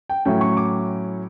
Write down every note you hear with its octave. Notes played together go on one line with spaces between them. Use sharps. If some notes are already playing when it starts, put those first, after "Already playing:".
G5
A2 F#3 C#4 E4 G5
C#6
D6